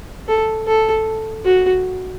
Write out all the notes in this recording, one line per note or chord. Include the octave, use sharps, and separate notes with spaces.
A4
A4
F#4